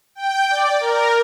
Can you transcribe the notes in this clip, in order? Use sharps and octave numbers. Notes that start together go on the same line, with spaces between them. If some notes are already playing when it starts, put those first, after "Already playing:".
G5
D5
A#4